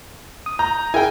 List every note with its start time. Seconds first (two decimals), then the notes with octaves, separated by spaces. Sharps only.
0.46 D#6
0.59 A#5 G6
0.94 E4 G#4 A#4 G5 G#5